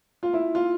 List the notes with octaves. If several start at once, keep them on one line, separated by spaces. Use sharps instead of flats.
F4
E4
F4